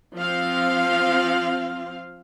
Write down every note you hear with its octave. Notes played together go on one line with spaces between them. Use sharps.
F3 C4 F4 F5